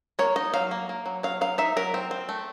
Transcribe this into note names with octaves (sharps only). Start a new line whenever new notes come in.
A#3 C#5
D#4 D#5
F#3 F5
A#3
A#3
F#3
F#3 F5
F#3 F5
D#4 E5
F#3 A#4
C4
C4
A3